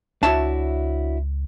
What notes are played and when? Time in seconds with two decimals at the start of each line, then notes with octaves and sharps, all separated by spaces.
0.23 C#2 D4 E4 F#4 C#5 E5 A5